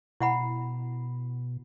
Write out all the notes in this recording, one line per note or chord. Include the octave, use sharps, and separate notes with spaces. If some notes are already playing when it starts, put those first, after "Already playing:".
B2 E4 F#5 B5